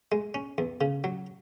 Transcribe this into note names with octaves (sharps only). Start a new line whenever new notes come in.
G#3
C#4
E2
C#3
F#3